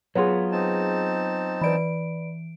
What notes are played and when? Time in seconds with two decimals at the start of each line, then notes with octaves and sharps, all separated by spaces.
0.15 F#3 B3 F4 G#4 B4 C#5 F#5 C6
0.52 C4 D#4 A5
1.61 E3 B4 D5 B5 D7